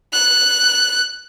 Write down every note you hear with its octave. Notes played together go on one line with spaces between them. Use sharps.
F#6